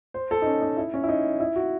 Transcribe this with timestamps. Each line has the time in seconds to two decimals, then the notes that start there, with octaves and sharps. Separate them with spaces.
0.14 C5
0.31 A4
0.42 D#4
0.46 C#4
0.62 D#4
0.77 E4
0.94 C#4
1.03 E4
1.09 D#4
1.40 E4
1.56 F#4